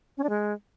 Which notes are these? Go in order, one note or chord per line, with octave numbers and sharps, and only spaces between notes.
C#4
D4
G#3